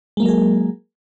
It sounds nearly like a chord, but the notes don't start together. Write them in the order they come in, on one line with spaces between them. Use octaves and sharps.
G#3 A#3 F#3 A#4 G#4